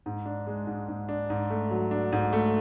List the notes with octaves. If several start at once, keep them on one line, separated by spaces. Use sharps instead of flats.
G#2
D4
G#3
G#2
G#2
D4
G#2
A3
F#3
D4
G#2
A3